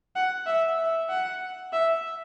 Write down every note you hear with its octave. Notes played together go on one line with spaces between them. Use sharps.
F#5
E5
E5
F#5
E5